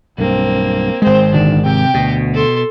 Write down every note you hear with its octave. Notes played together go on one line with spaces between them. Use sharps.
B1 G2 A#3 C4
G#1 G#3 C4 C5
A#1 D3 D#3 D4
C3 G4 G5
D2 B2
A4 C6